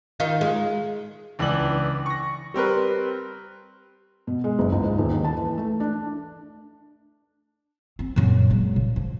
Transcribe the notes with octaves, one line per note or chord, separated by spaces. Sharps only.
D#3 D#4 F4
G#3
C#2 E3 D4 F#7
C#6 A#6
G3 C4 A#4 B4
B2
G#3
F#1
C#2
G#2
D#1
D#3
A5
E3
A3
D4
C4
F#2 A#2
F#3 G#3
A#2
F3